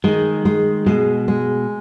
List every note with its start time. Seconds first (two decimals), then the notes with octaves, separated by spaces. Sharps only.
0.04 D#3 G#3
0.45 G#3
0.86 B2 G#3
1.28 G#3